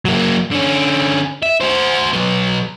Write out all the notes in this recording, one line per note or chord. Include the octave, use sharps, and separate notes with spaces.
F#3 A#3
D3 C#4
E5
F#4 C5
F#3 B3